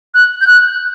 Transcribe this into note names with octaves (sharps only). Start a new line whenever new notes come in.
F#6
G6
F#6